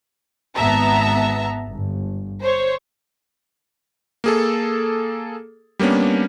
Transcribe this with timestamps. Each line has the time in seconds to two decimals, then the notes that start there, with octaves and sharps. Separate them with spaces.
0.58 G#1 B3 E5 A5 A#5
1.72 G1
2.40 C5 C#5
4.24 A#3 G#4 A4
5.79 G3 A#3 B3 C#4 D4